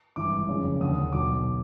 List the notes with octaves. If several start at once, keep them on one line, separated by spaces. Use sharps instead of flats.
G#1 G2 E3 D6
F#1 F2 C#3
D#2 D3 D#6
B1 B2 D6